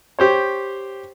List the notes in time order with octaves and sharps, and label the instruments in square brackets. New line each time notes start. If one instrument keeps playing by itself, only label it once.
[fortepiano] G4 C5 C#5